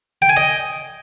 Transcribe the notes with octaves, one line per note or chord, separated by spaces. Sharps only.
G5
G#5
D#5